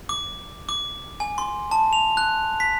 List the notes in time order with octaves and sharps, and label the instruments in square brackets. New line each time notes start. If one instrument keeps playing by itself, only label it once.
[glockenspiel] D6
D6
G#5
C6
A5
F7
F#6
B6